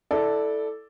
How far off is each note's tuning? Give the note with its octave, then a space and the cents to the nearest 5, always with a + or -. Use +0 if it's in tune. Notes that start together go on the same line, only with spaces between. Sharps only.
E4 -15 A4 +0 D5 +0